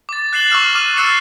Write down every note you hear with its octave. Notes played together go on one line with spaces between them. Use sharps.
D6 A6
F#6 A6 C7 E7 F#7 G7
C#6 D6 E6 F6 E7
D6 F6 D#7
E6 F#6 A6 C7 C#7 E7